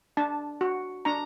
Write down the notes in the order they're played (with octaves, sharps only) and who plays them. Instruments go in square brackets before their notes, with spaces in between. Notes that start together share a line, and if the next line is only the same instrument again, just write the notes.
[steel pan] D4 A5
F#4
D4 A#5